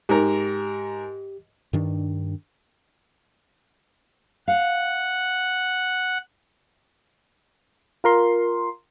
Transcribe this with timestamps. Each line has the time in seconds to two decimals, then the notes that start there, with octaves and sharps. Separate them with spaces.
0.09 G#2 G4 A#4
1.73 G2 D#3 D4
4.48 F5 F#5
8.04 F4 A#4 C6